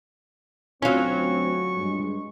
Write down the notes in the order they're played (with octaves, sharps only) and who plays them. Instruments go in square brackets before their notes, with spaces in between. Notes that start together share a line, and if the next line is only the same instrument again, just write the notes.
[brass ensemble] D2 C4 [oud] F#3 F4 [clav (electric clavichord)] C#4 F5 [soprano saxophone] C#6
[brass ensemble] G2 G#3